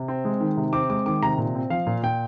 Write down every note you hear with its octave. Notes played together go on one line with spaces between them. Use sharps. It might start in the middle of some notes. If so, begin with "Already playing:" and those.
Already playing: C3
C4
G#3
D#3
C3
C4 D6
G#3 D6
D#3 D6
C3 A#5
A#2
C4
F3 F5
A#2
A#2 G5